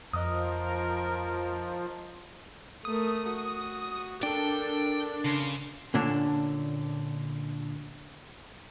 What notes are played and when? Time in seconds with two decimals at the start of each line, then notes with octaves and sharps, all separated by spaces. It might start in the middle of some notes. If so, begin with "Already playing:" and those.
0.13 F2 F3 A#4 D#5 D#6
2.85 A3 A#4 D#6
3.27 F#4
4.23 D4 A4 A#4 G5
5.25 C#3 C6
5.94 A#2 D3 C#4 D4